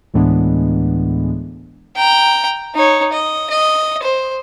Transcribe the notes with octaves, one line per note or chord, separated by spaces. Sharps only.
D2 A2 E3 G#3 B3 D4
G5 A#5
D#4 C#5
D#5
D#5
C5